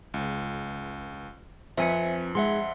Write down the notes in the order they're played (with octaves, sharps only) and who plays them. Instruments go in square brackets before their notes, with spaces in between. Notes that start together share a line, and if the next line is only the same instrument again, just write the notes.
[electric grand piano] C#2
[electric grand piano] F2 B4 [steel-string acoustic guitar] F3 C4 [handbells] E5 G#5 C#7
[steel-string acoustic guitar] G#3 D#4 [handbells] E5 F#5 C6